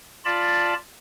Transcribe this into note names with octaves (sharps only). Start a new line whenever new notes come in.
F4 D5 A5 B5